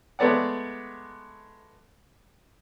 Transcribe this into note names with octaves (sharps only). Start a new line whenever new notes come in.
G#3 A3 B3 D5 F#5